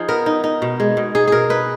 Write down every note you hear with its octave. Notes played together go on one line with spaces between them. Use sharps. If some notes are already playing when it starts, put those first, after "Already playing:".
Already playing: F3 D#4 G#4
B3 A#4
D#4
D#4
B2
G#3
B2
D#4 G#4
B2 G#4 A#4
D#4 B4